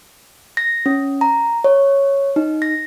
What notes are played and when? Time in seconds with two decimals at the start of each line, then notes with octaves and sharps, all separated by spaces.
0.57 A#6
0.86 C#4
1.21 A#5
1.64 C#5
2.36 D#4
2.62 A#6